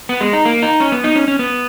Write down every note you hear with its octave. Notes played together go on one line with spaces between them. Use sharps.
B3
G#3
D#4
A#3
D#4
C#4
B3
D#4
C#4
C#4
B3